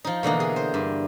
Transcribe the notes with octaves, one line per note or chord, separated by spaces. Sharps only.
F3 D#4
B2 D3 E3 A#3
G#4
C5
G2